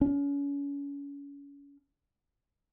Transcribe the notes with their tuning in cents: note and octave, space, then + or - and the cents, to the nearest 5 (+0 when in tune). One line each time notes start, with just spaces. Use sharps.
C#4 +35